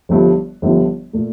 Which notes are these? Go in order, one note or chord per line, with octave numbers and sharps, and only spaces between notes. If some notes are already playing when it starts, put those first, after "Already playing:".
G1 G2 F3
G1 G2 F3
A#2 A3